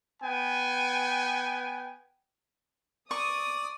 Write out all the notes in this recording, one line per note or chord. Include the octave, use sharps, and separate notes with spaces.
B3 G5 G#5
D5 C#6 D#6